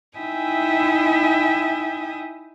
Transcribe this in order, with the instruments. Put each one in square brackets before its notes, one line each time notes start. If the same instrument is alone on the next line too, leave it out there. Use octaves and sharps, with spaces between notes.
[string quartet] D#4 E4 E5 G5 G#5 D#6